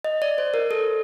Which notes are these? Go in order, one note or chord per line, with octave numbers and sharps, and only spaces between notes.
D#5
D5
C5
A#4
A4